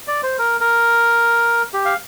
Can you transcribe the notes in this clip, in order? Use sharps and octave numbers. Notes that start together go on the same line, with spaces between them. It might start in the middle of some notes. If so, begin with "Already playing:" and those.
D5
C5
A#4
A#4
G4
F5